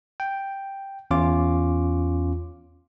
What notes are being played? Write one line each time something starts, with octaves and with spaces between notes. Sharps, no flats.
G5
E2 C#4 F4 D6